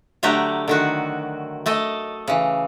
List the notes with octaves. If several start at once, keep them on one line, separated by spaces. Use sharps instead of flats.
D3 F#3 A3 G4 A#5
D3 D#3 F#4
A3 A4 D#5
C#3 E3